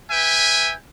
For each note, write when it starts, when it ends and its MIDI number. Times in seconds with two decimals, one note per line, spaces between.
0.11 0.73 71
0.11 0.73 76
0.11 0.73 79
0.11 0.73 80